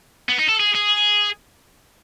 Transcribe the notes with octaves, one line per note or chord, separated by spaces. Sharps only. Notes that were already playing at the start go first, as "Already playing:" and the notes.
B3
D#4
A4
G#4
G#4